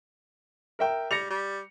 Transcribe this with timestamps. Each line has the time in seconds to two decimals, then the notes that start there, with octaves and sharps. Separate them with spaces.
0.79 A#4 E5 G5
1.11 G3 A#6 C#7 F7
1.30 G3